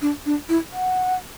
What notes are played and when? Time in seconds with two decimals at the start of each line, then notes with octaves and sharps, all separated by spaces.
0.02 D4
0.26 D4
0.49 E4
0.73 F#5